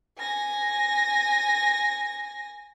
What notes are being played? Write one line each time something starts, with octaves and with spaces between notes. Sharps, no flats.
G#5 A#6